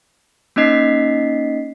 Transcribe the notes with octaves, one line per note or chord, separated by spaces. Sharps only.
A#3 C#4 D#4 D#5 B6 C7